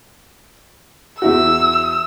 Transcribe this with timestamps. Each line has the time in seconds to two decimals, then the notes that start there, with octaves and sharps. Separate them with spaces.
1.22 E2 E4 F#4 E6